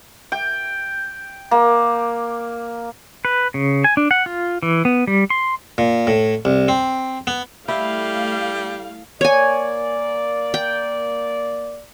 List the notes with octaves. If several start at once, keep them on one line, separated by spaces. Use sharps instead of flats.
G5
A#3
B4
C#3
G#5
D4
F#5
F4
E3
B3
G3
C6
A#2
A2
C2
C4
B3
G3 A3 E4 F5
A#3 C#5 D5 G#5
G5